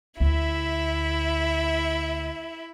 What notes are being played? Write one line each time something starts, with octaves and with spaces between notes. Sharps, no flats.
D2 E4 E5